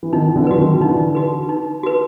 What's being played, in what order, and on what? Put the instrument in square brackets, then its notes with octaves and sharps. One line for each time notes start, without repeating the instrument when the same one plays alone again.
[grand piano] E3
[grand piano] D#3 F3 [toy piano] D#4
[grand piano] D3 E3
[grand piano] F#3 [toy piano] F#4 B4
[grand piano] D#3 F3
[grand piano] D3 E3 [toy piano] D#4
[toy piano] F#4 B4
D#4
F#4 B4